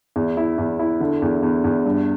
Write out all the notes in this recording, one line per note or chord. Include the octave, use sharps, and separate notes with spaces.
E2
E4
E2
E4
D3
E2
E2
E2
G2